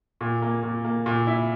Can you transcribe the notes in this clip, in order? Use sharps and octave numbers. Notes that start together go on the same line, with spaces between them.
A#2
A#3
A#2
A#3
A#2
E4